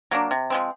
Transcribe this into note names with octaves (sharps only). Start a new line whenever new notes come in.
F#3 A#3 D4
C3
F3 G#3 C4